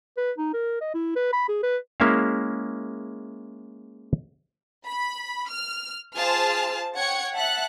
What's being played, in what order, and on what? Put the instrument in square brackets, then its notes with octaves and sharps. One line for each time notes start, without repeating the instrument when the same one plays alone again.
[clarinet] B4
D#4
A#4
D#5
E4
B4
B5
G#4
B4
[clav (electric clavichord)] G#3 A#3 C#4 E4 E5 F5
[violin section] B5
F6
F4 G#4 C5 A5 F6
C#5 F#5 G5 G#6 C#7
E5 F#5 A5 F#6